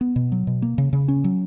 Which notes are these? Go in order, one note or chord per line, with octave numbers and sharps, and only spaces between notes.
B3
B2
F#3
B2
A#3
C#3
C#3
C#4
F#3